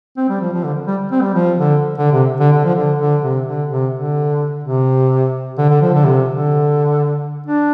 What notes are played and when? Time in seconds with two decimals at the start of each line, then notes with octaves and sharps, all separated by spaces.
0.17 C4
0.29 G3
0.41 F3
0.53 F3
0.64 D3
0.87 G3
1.12 C4
1.22 G3
1.34 F3
1.58 D3
1.98 D3
2.12 C3
2.40 D3
2.52 D3
2.64 F3
2.75 D3
2.99 D3
3.22 C3
3.47 D3
3.70 C3
3.93 D3
4.63 C3
5.58 D3
5.69 D3
5.82 F3
5.94 D3
6.04 C3
6.29 D3
7.47 D4